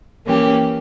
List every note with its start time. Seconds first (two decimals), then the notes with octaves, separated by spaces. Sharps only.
0.26 E3 A#3 C#4 G4